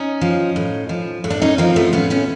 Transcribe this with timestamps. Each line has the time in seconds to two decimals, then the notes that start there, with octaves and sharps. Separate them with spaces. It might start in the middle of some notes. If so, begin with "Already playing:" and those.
Already playing: C#4 D#4
0.21 F3
0.56 A2
0.89 F3
1.24 A2
1.30 D4
1.42 C#4 D#4
1.58 F3 A#3 C4
1.76 A3 B3
1.93 A2 B3 C#4
2.10 B3 C#4